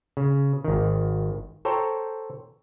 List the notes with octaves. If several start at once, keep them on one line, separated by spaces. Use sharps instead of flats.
C#3
G#1 D#3
A4 C5 C#5 G5 A#5